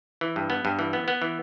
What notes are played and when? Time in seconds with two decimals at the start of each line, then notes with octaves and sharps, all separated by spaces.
0.21 E3
0.36 G2
0.50 B3
0.65 G2
0.79 E3
0.93 B3
1.08 B3
1.22 E3